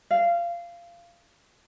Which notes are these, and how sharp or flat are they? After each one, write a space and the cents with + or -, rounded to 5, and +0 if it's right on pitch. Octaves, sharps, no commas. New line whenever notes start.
F5 -20